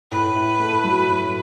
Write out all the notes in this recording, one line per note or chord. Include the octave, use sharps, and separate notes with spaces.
A2 B4
E4
A3
F#3
A2